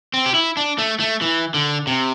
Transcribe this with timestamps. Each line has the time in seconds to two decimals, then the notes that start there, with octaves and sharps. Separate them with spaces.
0.14 C4
0.26 G4
0.34 E4
0.57 D4
0.78 A3
1.00 A3
1.21 E3
1.54 D3
1.87 C3